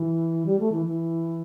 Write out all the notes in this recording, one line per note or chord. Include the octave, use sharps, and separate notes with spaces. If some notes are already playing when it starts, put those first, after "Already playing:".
Already playing: E3
G3
A3
E3
E3